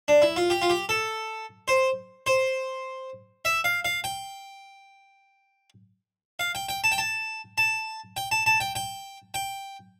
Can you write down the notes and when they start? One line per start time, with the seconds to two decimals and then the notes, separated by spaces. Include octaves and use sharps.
0.08 D4
0.22 E4
0.36 F4
0.50 G4
0.62 F4
0.70 G4
0.89 A4
1.68 C5
2.26 C5
3.45 E5
3.64 F5
3.85 F5
4.04 G5
6.39 F5
6.55 G5
6.69 G5
6.84 A5
6.92 G5
6.98 A5
7.58 A5
8.17 G5
8.31 A5
8.46 A5
8.60 G5
8.75 G5
9.34 G5